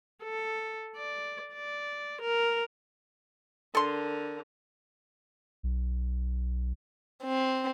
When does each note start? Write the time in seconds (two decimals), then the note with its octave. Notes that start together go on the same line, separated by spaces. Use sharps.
0.23 A4
0.96 D5
1.53 D5
2.21 A#4
3.75 D3 A4 A#4 C6
5.63 B1
7.24 C4